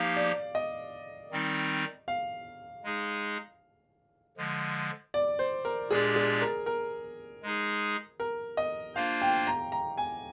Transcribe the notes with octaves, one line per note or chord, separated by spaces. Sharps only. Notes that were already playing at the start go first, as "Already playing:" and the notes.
Already playing: F3 A#3 D#4 G4 F5
D5
D#5
D#3 G3 C4 D#4
F5
G#3 D#4 G#4
D3 F3 G#3
D5
C5
A#4
A#2 G#3 D4 G4 G#4 D5
G#4
A#4
A#4
G#3 D#4 G#4
A#4
D#5
A#3 D4 F4 C5 F5
G5
A#5
A#5
G#5